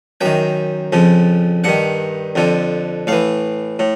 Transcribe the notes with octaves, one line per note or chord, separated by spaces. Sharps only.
F#2 D#3 G5
F2 C#3 F3
G2 D#3 F#5
F2 D3 F3
A2 E3 F5
A2